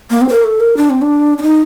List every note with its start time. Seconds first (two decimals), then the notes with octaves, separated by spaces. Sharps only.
0.11 A#3
0.22 C4
0.29 C5
0.32 A#4
0.44 A4
0.60 A#4
0.77 D4
0.90 C4
1.02 D4
1.38 D4
1.42 D#4